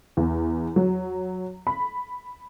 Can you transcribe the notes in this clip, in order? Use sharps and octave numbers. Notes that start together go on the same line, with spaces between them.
E2
F#3
B5